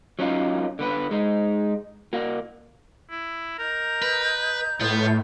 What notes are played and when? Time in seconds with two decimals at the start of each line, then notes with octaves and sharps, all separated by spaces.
0.19 F#3 C#4 D#4 F4
0.79 D3 B3 B4
1.11 G#3 D#4
2.13 A#3 F#4
3.11 E4
3.58 A#4 D#5 A#5 G6
4.02 B4
4.81 A2 B3 F4